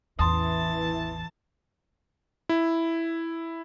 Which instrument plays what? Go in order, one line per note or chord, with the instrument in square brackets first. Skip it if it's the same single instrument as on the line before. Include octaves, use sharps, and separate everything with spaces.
[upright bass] A1 E2 [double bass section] E3 [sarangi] A5 [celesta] C6 D#6
[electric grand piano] E4